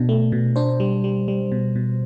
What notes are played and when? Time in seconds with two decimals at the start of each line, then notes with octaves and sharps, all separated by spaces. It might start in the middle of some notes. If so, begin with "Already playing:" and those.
Already playing: B2 D4
0.09 A3
0.32 B2
0.56 D4 C5
0.80 G3
1.04 G3
1.28 G3
1.52 B2
1.76 B2